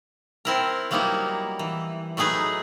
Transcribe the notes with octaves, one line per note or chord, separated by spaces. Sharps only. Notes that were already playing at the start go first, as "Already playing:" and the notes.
C4 E4 A#4
F#3 G3 A#3 B3 D#4 E4
E3
F#3 A3 D#4 G#4 B4